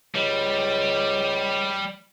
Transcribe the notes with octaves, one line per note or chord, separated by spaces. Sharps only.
C#2 G3